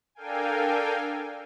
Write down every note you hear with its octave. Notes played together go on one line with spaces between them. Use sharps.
D4 A4 A#4 F5 G5 G#5